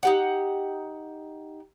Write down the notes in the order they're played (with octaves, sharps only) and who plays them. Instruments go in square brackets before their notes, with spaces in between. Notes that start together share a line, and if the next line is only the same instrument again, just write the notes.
[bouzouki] D#4 G4 F#5